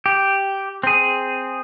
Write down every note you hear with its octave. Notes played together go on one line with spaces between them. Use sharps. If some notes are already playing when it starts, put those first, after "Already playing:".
G4
C4 G#4